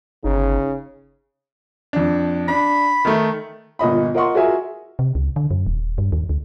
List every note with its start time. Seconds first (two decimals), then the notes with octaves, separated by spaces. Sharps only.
0.24 G1 C#3 D#4
1.93 F2 D4
2.49 D4 B5
3.05 D#3 A3
3.79 G1 A#2 D#5 B5
4.14 F4 A#4 D#5 F#5 C6 C#6
4.34 F4 F#4 G#4 A#4 E5 G#5
4.99 C3
5.15 C#2
5.36 D3
5.51 F#2
5.67 D#1
5.98 G2
6.12 D#2
6.29 D2